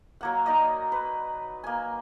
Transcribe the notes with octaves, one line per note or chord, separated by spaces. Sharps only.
F#3 A#3 F#5
D#4 A#4 D5 D#5
B4
A#3 G#5